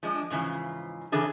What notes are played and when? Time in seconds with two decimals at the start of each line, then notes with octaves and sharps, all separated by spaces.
0.03 F3 G#3 D4
0.30 G#2 C#3 E3 F3
1.12 C#3 E3 D4 G#4 A4